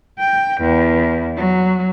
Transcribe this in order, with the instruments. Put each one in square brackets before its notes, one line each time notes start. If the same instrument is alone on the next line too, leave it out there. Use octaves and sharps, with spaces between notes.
[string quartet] G5
E2
F#3